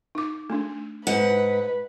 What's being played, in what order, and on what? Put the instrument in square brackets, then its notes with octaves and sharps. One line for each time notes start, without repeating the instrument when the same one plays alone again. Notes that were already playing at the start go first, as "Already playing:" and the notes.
[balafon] D#4 D6
A3 D4
[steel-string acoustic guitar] G#2 F#5 [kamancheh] B4